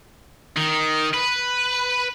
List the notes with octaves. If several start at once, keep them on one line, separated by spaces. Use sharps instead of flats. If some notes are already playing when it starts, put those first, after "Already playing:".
D#3
B4